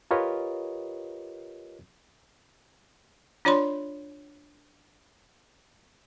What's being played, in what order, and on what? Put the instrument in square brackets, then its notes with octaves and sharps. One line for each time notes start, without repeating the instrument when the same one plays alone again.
[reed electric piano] F4 G4 A#4 B4 C#5 D#5
[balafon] D4 F4 C#5 D5 B5 C6